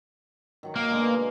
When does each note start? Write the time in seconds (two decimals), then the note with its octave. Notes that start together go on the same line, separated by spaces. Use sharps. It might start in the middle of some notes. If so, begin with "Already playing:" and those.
0.63 D#3 F#3 D#4
0.76 A#3
0.90 B2 D3 G#3